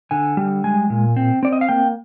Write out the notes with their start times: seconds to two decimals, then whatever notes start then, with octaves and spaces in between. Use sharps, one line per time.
0.11 D3 G#5
0.37 G3
0.64 G#3 G#5
0.90 A#2
1.17 C4
1.43 C4 D5
1.52 D#5
1.61 F5
1.69 A#3 G5